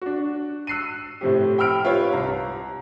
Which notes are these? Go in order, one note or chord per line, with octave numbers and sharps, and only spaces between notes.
D4 F#4
E6 F#6 C7 C#7 D#7
A2 C3 F3 G4
G5 B5 E6 F6 D7
F4 G4 B4 C#5 F5
C2 A#5